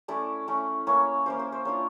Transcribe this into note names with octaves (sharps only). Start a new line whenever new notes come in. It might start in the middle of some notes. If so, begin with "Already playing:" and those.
A3 C#4 E4 D5
A3 C#4 E4
A#3 C#4 E4 C#5
A#3 C#4 E4 C5
C5
C5
A#3 D4 F4 C#5